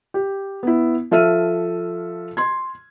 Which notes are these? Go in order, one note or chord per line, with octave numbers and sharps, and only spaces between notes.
G4
B3 E4
F3 A4 E5 F6 D#7
C6 G#6